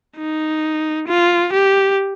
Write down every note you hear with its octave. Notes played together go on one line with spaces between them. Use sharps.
D#4
F4
G4